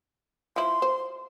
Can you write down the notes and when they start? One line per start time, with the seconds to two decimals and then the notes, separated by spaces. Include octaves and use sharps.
0.56 F3 E4 C6
0.82 C5